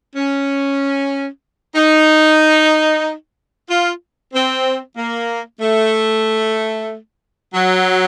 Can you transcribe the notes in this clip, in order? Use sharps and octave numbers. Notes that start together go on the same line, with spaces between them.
C#4
D#4
F4
C4
A#3
A3
F#3